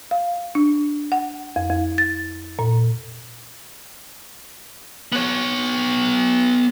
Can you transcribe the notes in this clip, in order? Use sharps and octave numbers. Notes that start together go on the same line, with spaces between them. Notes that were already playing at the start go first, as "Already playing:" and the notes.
F5
D4
F#5
F2
F2
A6
A#2
B3 C#5